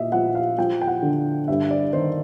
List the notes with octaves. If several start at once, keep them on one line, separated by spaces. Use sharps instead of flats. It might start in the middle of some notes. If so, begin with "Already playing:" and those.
Already playing: A#2 D#5 E5
F3 F#5
F5
F3 G5
G5
F#5
D3
G2 E5
D5
D#3 C5